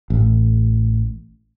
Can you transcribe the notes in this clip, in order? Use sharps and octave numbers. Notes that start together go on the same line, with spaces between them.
A1